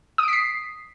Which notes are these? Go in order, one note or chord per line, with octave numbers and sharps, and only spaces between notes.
D#6 B6 C7 D7